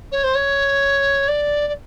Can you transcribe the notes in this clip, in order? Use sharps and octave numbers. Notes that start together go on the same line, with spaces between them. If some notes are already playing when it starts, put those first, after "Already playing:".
C#5
C5
C#5
D5
D5